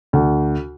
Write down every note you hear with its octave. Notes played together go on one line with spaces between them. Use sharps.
D2